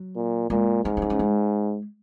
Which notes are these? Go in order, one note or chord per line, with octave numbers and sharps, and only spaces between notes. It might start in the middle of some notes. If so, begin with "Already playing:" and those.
Already playing: F#3
A#2
A#2 G#3
G#2 A#3
C#4
D#4
C#4
G#3